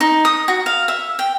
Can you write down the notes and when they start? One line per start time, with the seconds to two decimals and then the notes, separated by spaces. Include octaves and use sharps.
0.01 D#4
0.25 D#6
0.48 F#4
0.66 F5
0.88 E5
1.19 G5